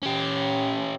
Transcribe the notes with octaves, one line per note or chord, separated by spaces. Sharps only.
C#4 G4